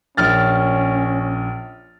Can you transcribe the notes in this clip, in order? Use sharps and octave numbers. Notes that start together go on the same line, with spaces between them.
A#1 C#4 F6 A6